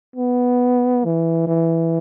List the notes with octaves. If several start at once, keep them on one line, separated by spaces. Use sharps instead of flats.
B3
E3
E3